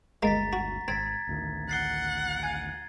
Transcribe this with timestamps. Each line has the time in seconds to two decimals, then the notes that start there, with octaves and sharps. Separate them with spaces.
0.23 G1 D2 G#3 A#3 A#5 A6 B6
0.53 F#4
0.88 G#1 C4 G#6 A6 B6
1.27 A1 D2 D#3
1.69 F#5 A6 C7 G7
2.43 G#5 G#6